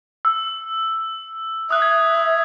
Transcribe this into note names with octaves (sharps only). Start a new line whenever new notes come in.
E6
E5 D#6 F#6
G#6